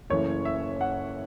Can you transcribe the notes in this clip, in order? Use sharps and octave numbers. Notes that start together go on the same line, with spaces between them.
F#1 F#2 E3 A3 C#5
E5
F#5